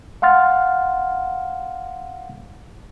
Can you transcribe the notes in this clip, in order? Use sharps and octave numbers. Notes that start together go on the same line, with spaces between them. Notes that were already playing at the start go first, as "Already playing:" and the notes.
F5 F#5 C6 F6 A6